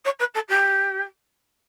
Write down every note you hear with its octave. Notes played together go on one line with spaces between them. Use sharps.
C#5
B4
A4
G4